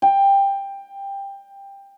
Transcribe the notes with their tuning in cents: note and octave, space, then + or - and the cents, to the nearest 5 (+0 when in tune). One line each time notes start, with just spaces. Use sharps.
G5 +15